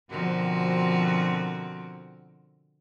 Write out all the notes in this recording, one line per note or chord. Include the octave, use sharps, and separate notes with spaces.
B2 D3 F3 C4 F#4 A#4